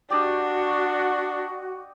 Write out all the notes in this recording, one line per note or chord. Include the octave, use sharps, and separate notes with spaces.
D4 F#4 G4 D5 D#5